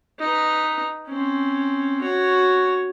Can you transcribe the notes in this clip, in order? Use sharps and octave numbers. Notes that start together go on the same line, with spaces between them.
D#4 B4
C4 C#4
F#4 C#5